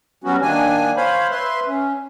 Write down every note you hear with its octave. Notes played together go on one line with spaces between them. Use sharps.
F#3 G3 B3 C#4 F#4
D#3 A#3 D4 G#5
C5 C#5 F5 B5
B4 E5 C6
C#4